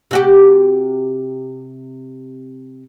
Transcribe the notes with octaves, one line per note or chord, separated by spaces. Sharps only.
C3 F#4 G4